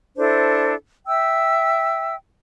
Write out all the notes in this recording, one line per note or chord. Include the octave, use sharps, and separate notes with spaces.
D4 E4 A4 C5
E5 G5 E6